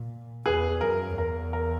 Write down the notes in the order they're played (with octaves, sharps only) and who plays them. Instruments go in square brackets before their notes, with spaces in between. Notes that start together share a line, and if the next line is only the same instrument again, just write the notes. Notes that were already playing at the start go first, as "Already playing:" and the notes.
Already playing: [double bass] A#2
[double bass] E2 [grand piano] G#4 B4
[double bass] F#2 [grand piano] A#4
[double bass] E2 [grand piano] A#4
[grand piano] A#4